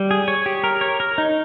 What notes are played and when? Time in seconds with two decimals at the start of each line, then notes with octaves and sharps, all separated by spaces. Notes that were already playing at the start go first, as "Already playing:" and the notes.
Already playing: G3
0.11 G#4
0.28 C#5
0.46 G4
0.64 A#4
0.81 C#5
1.00 A#4
1.18 D#4